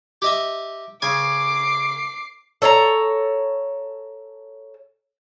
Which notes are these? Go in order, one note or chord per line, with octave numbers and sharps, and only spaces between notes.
G4 D#5 E5
C#3 G#5 D6 C7
A4 C#5 A5 A#5